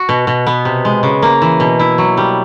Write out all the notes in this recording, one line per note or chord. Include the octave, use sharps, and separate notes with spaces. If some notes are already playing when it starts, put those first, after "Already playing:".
Already playing: F#4
B2
B2
B3
C3
G#3
C#3
A#3
E3
B2
E4
F#3
G3